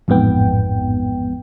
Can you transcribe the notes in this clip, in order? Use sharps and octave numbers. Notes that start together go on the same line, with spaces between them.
A1 F2 G#2 B3 G5